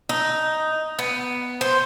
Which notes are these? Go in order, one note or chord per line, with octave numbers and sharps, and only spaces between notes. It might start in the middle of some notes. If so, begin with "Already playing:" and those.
D#4
B3
C5